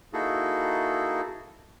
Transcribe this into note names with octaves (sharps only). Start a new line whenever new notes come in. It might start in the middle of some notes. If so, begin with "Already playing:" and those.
A#3 D#4 E4 F#4 G#4 A4